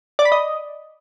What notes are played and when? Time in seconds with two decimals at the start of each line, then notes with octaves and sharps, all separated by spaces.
0.19 D5
0.25 B5
0.32 D#5